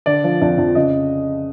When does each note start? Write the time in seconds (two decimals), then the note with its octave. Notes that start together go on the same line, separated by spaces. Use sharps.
0.06 D3 D5
0.24 F3
0.41 F2 D5
0.58 F2
0.75 C#3 D#5